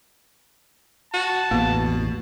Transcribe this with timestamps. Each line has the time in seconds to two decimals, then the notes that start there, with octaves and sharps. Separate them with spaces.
1.14 F#4 A5
1.51 A1 E2 B2 A#3